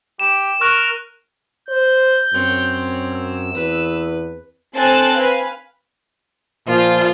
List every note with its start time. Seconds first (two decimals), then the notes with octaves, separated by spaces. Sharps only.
0.20 G4 E7
0.61 A#4 C#6 F6 F#6
1.69 C5 G6
2.34 F#2 C4 C#5
3.11 E6
3.54 E2 B4
4.75 C4 A4 G#5 A5 F#6
5.17 B4 F5 G#5
6.68 A#2 F3 F4